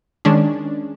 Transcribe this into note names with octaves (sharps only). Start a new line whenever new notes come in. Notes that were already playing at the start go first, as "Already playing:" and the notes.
D#3 G#3 C#4 D4